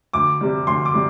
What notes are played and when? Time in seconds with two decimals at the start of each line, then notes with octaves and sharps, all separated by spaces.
0.13 D2 D6
0.41 C3 G3
0.67 D2 C6
0.85 D6
0.94 C3 G3